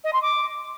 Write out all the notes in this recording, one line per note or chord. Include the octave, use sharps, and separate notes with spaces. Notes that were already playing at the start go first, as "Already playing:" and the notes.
D#5
C6
D6